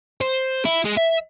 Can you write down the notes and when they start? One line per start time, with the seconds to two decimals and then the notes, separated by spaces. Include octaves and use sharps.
0.21 C5
0.65 E4
0.85 G#3
0.97 E5